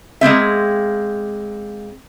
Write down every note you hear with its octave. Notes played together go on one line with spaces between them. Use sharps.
G#3 A#3 C4 E5